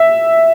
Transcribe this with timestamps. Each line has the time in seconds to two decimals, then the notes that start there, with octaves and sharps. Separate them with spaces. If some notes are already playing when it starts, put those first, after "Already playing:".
Already playing: E5